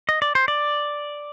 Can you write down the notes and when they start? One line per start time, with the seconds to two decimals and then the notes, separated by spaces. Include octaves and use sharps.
0.09 D#5
0.22 D5
0.35 C5
0.48 D5